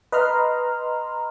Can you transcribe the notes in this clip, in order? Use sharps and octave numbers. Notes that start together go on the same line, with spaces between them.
B4 D#5 A#5 C6 F6